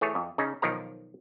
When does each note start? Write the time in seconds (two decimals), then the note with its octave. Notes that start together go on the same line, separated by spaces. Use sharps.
0.01 E3 A3 G#4 C#5
0.15 F2
0.38 C#3 C#4 D#4
0.62 B1 D#3 F3 A#4 A#5